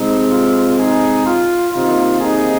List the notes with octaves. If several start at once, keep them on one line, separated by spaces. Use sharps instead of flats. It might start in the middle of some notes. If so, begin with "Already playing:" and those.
Already playing: C3 G#3 C4 D#4
F4
D#4 G#4
F4
C3 D#3 A#3 D#4 F4
D#4 G#4